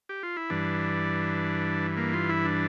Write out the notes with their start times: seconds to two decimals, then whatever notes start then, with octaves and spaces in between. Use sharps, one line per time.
0.09 G4
0.23 F4
0.37 E4
0.50 G2 E3 D4
1.97 A#3
2.13 F4
2.29 E4
2.45 D4